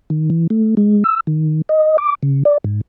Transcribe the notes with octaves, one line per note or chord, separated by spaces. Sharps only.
D#3
E3
A3
G#3
E6
D#3
D#5
D6
C#3
D5
G#2